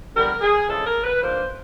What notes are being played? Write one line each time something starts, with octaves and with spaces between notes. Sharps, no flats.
F2 D3 G3 B3 A#4
G#4
F2 C#3 E3 G#3 A4
A#4
B4
G#2 F3 A#3 D4 C5